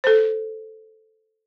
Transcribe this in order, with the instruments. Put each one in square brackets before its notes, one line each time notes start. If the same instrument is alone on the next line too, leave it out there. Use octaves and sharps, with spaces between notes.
[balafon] A4 C5